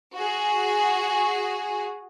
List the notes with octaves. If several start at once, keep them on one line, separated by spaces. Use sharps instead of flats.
F#4 G#4